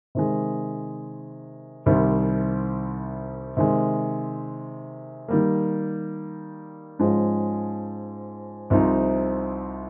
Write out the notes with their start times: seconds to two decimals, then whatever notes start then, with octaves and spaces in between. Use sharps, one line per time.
0.15 C3 D#3 G#3
1.86 C2 C3 D#3 G3 C4
3.57 C3 D#3 G#3
5.28 D#3 G3 A#3
6.99 G#2 F3 G#3 C#4
8.70 C2 C3 F3 C4 D#4